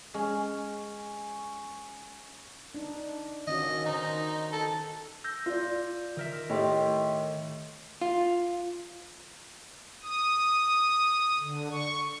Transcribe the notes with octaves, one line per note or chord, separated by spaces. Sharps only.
G#3 C#4
D4 D#4
D#3 C#4 F#4 D#5
D#3 D#4 C5
A4
E6 G6 A#6
F4 D5
D#3 A#4 E5
A2 G4 D#5 G5 C6
F4
D#6
D3
C#6